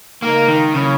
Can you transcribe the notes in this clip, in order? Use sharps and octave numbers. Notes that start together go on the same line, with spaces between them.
C#3 G#3 A#3 D#4 A#4
D#3
C#3 F#3 A#3 E4 A#4 C#5